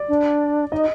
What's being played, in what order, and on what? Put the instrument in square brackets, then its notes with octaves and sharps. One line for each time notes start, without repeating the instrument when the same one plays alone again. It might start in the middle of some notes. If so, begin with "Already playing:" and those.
Already playing: [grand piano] D5
[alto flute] D4
[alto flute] D#4 [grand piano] D#5